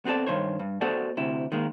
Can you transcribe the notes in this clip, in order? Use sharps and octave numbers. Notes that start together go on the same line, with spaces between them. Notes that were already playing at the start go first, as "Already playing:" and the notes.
B3 C4 G4 A4 D5
G2 D#3 C5 C#5
G2
B3 F#4 A4 C5 D5
D2 C3 E4
D#3 G#3 A#3